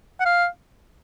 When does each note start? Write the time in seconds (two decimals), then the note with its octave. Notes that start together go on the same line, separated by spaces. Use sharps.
0.20 F#5
0.25 F5